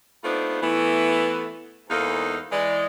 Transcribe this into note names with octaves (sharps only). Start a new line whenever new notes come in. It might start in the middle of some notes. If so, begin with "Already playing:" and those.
A3 B3 C4 D4 D#4 F4
E3 A3 B3
E2 G#2 A#3 D#4 A4 F5
E3 G#3 D5